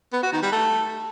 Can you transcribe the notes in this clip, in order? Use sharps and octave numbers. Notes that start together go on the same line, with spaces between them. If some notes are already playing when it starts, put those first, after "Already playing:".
B3
F#4
D#3
G3
A3